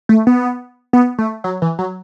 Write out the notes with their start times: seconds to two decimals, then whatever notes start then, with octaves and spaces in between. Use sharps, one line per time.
0.09 A3
0.27 B3
0.93 B3
1.18 A3
1.44 F#3
1.62 E3
1.79 F#3